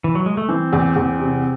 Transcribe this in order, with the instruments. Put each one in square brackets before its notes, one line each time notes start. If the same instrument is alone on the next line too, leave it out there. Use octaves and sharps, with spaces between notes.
[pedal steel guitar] E3
F#3
G#3
A3
[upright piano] E3 [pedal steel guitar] C4
[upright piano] E2
E2
C3